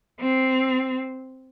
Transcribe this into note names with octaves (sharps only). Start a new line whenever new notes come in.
C4